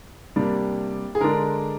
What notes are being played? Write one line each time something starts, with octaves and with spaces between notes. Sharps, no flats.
C3 G3 A#3 D4
G#4
D3 G#3 D4 A#4